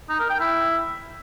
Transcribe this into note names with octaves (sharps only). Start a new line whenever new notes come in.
D#4
A#4
G5
E4